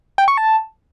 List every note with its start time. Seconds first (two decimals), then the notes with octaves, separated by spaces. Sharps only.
0.18 G5
0.28 C#6
0.37 A5